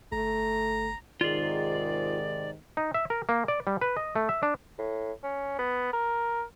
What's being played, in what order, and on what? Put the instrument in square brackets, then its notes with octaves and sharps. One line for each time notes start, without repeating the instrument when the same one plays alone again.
[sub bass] G1 [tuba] A3 [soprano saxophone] A#5
[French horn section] G#2 C3 D#3 [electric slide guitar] F4 G#4 [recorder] D5
[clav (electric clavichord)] D#4
E5
A#4
A#3
D5
G3
B4
D#5
A3
E5
D4
[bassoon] A2
C#4
B3
A#4